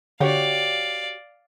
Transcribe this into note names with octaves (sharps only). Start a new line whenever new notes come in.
D3 F#4 G4 C#5 D5 F5